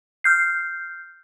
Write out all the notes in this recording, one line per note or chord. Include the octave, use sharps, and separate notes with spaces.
F6 G6 C7